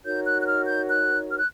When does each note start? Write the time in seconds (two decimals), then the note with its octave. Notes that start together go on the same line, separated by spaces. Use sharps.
0.04 D#4 F#4 A#4 C#5 G6
0.25 F#6
0.41 F#6
0.46 F6
0.66 G6
0.88 F#6
1.30 F6
1.38 F#6